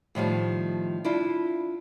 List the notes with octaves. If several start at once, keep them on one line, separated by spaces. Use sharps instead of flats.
A2 D#3 F3 G3
D4 E4 F4